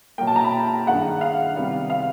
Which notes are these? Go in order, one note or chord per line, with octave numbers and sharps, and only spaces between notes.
B2 F#3 A#3 G5
A5
A#5
B5
G2 D#3 G#3 F#5
F5
C3 D#3 G3 B3
F5